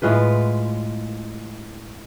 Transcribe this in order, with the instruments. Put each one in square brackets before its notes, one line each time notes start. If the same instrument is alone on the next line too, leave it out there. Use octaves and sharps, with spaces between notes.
[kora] A2 G#3 F4 B4